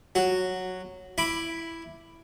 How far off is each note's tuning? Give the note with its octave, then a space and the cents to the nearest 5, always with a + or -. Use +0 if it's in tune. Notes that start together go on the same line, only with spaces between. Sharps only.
F#3 -5 F#4 +0
E4 +5 B5 +0 D6 +0